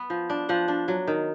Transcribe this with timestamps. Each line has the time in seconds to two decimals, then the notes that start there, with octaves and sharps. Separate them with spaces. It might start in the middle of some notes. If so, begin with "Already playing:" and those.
Already playing: B3
0.10 F3
0.30 D4
0.49 F3 F#5
0.68 D4
0.88 F#3
1.07 D#3